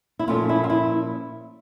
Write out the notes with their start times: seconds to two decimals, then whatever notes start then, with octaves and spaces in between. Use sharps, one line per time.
0.19 E4
0.28 A#2 F3 A3 C#4 F4
0.49 E4
0.64 F4
0.70 E4